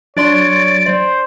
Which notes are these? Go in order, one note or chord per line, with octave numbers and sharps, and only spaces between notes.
F#3 D4 C#5 D5 C6 A6 D7
C5 D5